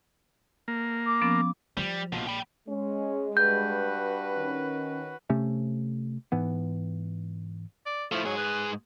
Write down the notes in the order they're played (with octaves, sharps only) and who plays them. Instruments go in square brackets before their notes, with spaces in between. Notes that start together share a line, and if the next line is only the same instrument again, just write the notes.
[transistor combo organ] A#3
[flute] D6
[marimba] F3 B3 C#4
[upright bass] F3 [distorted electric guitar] G3
[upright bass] A#1 [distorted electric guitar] B2 F3
[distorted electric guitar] G5 B5
[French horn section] G#3 [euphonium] C#4
[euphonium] G2 [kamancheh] F#4 B4 [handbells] G6
[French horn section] D#3 C#4
[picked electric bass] C3 A3 C#4
G#2 E3 B3
[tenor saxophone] D5
[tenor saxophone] F3 [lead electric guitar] A3 E4
[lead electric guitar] G#2 G#4 [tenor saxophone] F#3
[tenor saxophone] B4